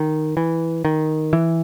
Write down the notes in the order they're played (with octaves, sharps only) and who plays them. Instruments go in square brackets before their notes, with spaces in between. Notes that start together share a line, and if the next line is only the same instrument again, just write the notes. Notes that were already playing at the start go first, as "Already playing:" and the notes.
Already playing: [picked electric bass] D#3
E3
D#3
E3